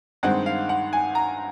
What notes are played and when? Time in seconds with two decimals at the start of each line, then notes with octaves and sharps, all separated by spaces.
0.23 G2 D#3 G#3 C4 F#5
0.46 F5
0.69 F#5
0.93 G#5
1.15 A#5